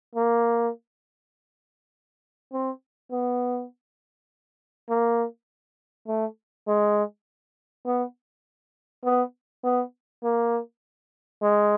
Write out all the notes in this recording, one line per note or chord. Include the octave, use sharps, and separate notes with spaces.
A#3
C4
B3
A#3
A3
G#3
B3
B3
B3
A#3
G#3